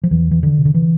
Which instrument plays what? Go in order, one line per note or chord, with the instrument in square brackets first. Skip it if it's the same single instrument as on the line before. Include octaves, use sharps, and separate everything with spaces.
[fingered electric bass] F3
E2 E3
E3
D3
C3
D3
E3